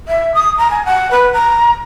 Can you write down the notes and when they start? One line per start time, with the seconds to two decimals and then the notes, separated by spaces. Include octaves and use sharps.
0.08 E5
0.34 D#6
0.58 A#5
0.70 G#5
0.85 F#5
1.11 B4
1.33 A#5